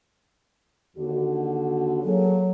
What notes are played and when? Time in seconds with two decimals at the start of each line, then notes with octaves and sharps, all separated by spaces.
0.97 D#2 D3 F#4
2.04 F#3 A#3 G#4 A4